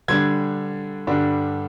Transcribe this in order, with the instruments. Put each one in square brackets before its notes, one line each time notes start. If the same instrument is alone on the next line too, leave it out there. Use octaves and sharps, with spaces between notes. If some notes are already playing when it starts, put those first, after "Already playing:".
[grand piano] D3 G3 D4 G#6
G2 D3 G3 D4